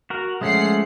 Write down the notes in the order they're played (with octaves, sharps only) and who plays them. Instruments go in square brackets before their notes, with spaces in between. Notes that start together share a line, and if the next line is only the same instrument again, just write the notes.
[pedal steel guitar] F#4 A#4
[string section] F3 F#5 C7 [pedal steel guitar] G#3 A3 C#4